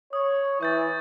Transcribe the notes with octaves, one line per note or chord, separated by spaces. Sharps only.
C#5 D#6
E3 C#6 G6 A6